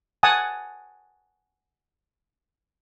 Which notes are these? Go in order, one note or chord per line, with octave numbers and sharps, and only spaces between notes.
F#5 G#5 A5 D#6